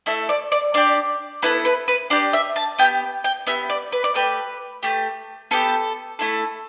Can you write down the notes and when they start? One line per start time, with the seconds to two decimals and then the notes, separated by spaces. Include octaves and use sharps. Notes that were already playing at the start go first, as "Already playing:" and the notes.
0.06 A3 E4 A4 E5
0.29 D5
0.52 D5
0.74 D4 G4 D5
1.42 B3 E4 A4 B4
1.65 B4
1.88 B4
2.10 D4 G4 D5
2.33 E5
2.56 A5
2.79 B3 G5
2.82 G4
3.24 G5
3.47 B3 G4 E5
3.70 D5
3.92 B4
4.04 D5
4.15 A3 G4 B4
4.83 A3 G4
5.51 B3 G4 A4
6.19 A3 E4 A4